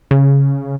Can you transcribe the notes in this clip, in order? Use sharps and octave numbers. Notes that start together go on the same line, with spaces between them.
C#3